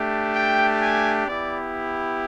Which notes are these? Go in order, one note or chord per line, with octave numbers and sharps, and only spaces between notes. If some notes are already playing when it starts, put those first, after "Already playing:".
Already playing: A3 D4 G4
G5
G#5
B3 E4 G4 D5